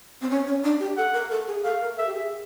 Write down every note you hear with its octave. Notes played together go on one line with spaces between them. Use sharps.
C4
C#4
C#4
D4
G4
A4 F#5
A#4
A4
G#4
A4 F5
A#4
A4 E5
G4
G#4